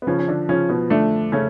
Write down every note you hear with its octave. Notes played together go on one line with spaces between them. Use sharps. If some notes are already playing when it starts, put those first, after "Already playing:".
B3
C#3 F3 C#4
C#4
D3 D4
C#3 F3 C#4
B2 B3
D3 A3 D4
C#3 A3 C#4